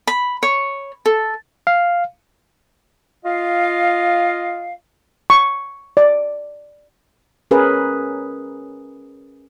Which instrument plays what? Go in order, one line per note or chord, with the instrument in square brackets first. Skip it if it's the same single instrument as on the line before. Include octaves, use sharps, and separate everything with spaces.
[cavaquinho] B5
C#5
A4
[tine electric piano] F5
[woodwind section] F4 D#5 F5
[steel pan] C#6
D5
[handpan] C#4 G#4 A#4 B4